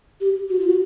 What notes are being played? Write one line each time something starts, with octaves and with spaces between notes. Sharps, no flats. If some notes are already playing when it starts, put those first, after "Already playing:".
G4
F#4
F4
F#4